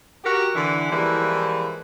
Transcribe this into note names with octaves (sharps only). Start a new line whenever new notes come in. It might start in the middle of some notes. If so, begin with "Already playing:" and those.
F#4 G4 A#4
D3 E3
E3 F3 G3 G#3 A#3 E4